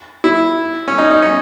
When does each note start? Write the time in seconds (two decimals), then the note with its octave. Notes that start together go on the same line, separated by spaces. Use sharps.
0.24 E4
0.88 C#4
0.98 D#4
1.10 D#4
1.22 C#4